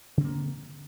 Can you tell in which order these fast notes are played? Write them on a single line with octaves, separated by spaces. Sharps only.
C#3 C4 A#3